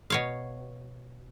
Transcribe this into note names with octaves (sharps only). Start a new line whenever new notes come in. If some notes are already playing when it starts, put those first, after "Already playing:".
B2 C#5 F5